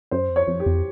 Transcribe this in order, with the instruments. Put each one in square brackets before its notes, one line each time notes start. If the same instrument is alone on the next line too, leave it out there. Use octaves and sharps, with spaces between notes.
[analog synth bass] F#2 [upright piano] C5
[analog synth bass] F2
[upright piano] C#5
[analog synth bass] F2
[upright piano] G4
[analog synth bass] F2